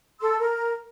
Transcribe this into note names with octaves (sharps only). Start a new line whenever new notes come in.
A4 C6 E6
A#4